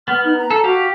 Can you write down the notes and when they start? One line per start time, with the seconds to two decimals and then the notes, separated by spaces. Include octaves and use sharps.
0.08 B3 F6
0.25 D#4
0.37 A#5
0.50 A4
0.64 F#4 G4 F5